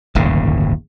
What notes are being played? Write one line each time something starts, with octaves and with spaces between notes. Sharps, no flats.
D1 G1 D#2 C#3